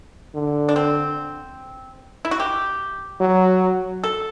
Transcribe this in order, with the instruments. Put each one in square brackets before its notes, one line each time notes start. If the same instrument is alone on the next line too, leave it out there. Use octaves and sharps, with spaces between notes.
[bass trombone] D3
[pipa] D4
C4
E4
F#4
G4
[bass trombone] F#3
[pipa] A4